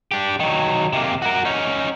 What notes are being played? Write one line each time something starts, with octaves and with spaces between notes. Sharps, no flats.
D4 G4
D#3 F#3
C3 A#3
F#4 A#4
C#4 D#4